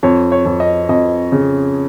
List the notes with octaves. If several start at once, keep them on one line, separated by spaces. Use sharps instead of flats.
F2 C#5
C#5
F2
D#5
F2 D#5
C#3